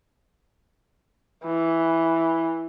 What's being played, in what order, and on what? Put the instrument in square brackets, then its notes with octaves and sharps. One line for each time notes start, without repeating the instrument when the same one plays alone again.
[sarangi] E3